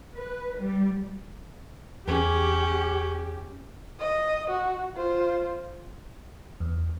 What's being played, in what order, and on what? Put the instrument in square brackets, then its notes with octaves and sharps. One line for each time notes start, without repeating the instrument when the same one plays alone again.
[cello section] B4
G3
[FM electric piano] E2 G#4 [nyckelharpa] C#4 [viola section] G4
[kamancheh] D#5
F#4
F4 C5
[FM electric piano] E2